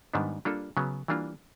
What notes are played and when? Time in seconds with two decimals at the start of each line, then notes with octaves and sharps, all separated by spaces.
0.14 G#2 D#3 G3 B3 D4
0.45 G3 A#3 D4 F4 A4
0.77 C#3 F#3 B3
1.08 E3 G3 A#3 D4 F4